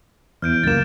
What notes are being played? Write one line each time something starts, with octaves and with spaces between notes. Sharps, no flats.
E2 F6 G6 D7
C#2 F#2 A#3 A6 E7